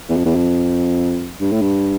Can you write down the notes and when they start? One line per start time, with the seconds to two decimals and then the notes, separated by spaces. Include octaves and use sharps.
0.09 E2
0.17 F2
0.25 E2
0.35 F2
1.41 G2
1.52 A2
1.61 G2